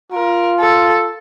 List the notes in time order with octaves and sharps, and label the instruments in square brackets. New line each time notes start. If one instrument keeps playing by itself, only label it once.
[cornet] F4 [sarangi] A#4
[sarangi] A4